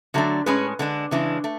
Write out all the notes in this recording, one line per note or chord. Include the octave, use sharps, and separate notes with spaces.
D3 F#3 A3 D4
A2 G#3 C#4 G#4 B4
D3 G#3 D4
C#3 E3 G#3 D4
A3